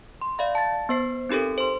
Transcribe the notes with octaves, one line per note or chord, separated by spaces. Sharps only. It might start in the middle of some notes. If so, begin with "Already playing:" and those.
C6
D5 E5 F5 B5
A5 A6
B3 C5 C7
C4 D#4 G4 A4 A#4
C5 C6